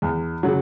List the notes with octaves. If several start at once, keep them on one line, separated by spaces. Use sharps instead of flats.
E2
C#3 F#3